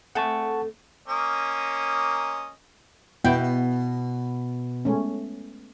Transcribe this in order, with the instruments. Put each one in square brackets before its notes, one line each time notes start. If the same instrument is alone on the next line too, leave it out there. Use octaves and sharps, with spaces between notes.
[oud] A3 C4 G#4 [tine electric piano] F#5 A5 C#6
[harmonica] A#3 C#4 D#5
[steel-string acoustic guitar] B2 [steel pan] B3 E4 G5
[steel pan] G#3 A3 C#4